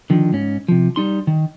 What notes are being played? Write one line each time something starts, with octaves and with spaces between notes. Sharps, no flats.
D3 D#3 F3
G#2 C#4
C3 F3
G3 D#4 C6
D#3